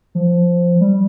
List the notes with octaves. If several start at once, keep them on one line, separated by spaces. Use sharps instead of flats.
F3
G3